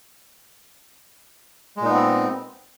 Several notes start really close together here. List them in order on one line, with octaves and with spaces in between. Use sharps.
G#3 A#2 D#4 B3 C4